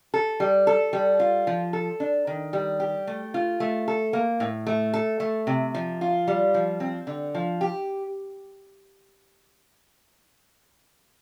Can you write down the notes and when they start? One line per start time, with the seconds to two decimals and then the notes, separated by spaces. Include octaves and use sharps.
0.14 A4
0.40 G3
0.67 A4
0.93 G3
1.20 F4
1.47 F3
1.73 A4
2.00 D4
2.27 D#3
2.53 G3
2.80 G4
3.07 A3
3.34 F4
3.60 A3
3.88 A4
4.13 A#3
4.40 A2
4.67 A3
4.94 A4
5.20 A3
5.47 C3
5.75 F3
6.01 F4
6.27 G3
6.54 F3
6.80 C4
7.07 D3
7.35 F3
7.61 G4